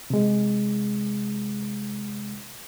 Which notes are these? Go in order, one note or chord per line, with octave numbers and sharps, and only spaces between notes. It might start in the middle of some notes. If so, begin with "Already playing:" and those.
C3 G#3